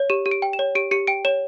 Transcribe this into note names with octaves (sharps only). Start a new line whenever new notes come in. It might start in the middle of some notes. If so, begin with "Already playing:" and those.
Already playing: C#5
G4 E7
G4
D7
G5
E7
C#5
G4 D7
G4 C#7
G5 D7
C#5 E7